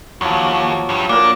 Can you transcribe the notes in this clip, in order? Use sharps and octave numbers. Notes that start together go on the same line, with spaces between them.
D#2 F3 F#3
G2 G3
A#2 D4 A#4